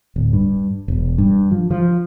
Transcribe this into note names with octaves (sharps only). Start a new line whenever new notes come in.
D1
G2
E1
G2
F3
F3